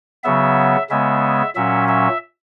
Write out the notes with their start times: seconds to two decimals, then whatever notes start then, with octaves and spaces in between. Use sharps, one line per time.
0.24 C#3 F#3 B3 E5
0.90 C#3 G#3 B3 E5
1.55 A#2 F#3 C#4 E5
1.88 E5